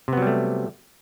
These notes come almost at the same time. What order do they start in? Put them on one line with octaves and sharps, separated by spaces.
C3 B3 F#3 G3 A3